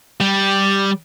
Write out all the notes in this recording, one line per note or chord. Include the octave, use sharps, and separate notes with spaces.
G3